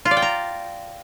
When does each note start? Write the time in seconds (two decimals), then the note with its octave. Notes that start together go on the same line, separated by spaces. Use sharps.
0.05 F4
0.11 D5
0.17 G5
0.22 A#5